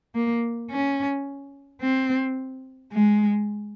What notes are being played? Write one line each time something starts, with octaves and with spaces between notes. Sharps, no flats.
A#3
C#4
C4
G#3